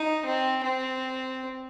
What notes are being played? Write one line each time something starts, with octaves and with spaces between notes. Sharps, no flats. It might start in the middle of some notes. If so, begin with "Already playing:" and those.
Already playing: D#4
C4
C4